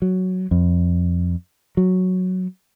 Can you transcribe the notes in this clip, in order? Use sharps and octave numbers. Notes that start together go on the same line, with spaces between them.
F#3
F2
F#3